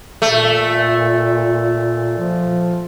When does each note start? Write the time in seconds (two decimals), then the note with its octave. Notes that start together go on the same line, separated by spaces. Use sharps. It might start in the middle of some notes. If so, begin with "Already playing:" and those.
0.22 A#2 A3
2.18 F3